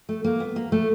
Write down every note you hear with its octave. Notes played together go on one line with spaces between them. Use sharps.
A3
A#3
B3
A#3
A3